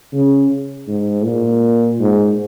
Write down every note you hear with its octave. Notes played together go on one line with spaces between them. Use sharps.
C#3
G#2
A#2
G#2